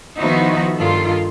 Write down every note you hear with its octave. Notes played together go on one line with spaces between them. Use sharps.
D#3 F3 B3 D#4 E4 F#4
G2 D#3 F4 A4